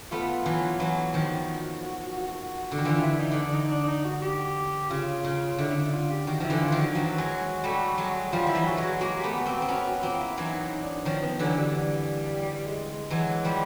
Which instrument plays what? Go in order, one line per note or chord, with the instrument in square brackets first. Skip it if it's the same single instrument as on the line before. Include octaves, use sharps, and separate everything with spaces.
[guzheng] A3 B3 [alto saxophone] F4
[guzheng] E3 F#3
[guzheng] E3 F#3 [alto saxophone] F#4
[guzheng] D#3 F3
[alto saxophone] F#4
[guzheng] D3
D#3
[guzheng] D3 E3 [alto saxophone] F4
[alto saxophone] E4
D#4
[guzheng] D3
[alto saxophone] D4
D#4
D4
D#4
F#4
G4
[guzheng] C#3 [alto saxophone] F4
[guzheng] C#3
[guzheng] D3 [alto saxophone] E4
[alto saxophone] D#4
F4
G4
[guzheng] D#3 [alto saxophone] F#4
[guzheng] F3 [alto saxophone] E4
[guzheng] D3 E3
[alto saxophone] F4
[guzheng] D#3 F3
[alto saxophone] F#4
[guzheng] E3 F#3 [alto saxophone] F#4
[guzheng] F#3 G#3
G3 A3
F#3 G#3
[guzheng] F3 G3 [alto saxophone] F4
[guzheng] F3 [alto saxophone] E4
[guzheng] E3 F#3
[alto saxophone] F#4
[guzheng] F#3 G#3
[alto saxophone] F#4
[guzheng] G#3 A#3 [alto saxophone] F#4
[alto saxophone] G4
[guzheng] A3 B3
[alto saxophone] F#4
[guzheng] A#3 C4
[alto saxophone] F#4
[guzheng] C4
[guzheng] B3 C#4 [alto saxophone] F#4
[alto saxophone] F#4
[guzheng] A#3 C4 [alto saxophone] F4
[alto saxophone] E4
[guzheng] E3 F#3 [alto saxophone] D#4
[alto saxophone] D#4
D4
[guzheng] D#3 F3 [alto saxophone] C#4
[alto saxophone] B3
[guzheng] D3 E3 [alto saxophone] F#3
[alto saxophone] G3
G3
G#3
G#3
[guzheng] E3 F#3
F3 G3